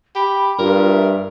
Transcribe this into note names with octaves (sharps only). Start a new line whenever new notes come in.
G4 B5
G2 F4 A#4
E5